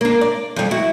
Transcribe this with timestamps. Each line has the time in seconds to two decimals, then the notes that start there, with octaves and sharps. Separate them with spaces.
0.01 A#3 D4
0.21 D5
0.56 F2 G3
0.71 E4 F#4